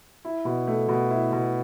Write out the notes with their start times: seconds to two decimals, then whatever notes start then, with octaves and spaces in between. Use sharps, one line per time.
0.25 E4
0.45 B2
0.68 A3
0.89 B2
1.11 E4
1.32 B2